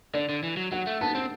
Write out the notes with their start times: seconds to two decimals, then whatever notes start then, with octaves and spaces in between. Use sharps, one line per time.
0.14 D3 D5
0.29 D3
0.43 E3
0.57 F#3
0.72 F#3 F#5
0.87 A3
1.01 B3 A5
1.15 C4